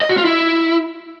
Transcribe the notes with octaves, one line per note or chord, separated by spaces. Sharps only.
D#5
F#4
F4
E4